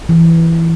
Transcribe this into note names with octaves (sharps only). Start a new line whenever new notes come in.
E3